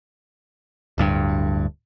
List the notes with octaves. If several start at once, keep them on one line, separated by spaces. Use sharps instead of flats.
D1 D2 G2